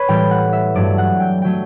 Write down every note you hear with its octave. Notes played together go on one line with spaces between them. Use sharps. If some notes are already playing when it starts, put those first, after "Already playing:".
Already playing: B4 C#5
A2 E3 G3 G5
F#5
E5
G2 F#3 A3 D5
F#5
G5
F#3 A3 G5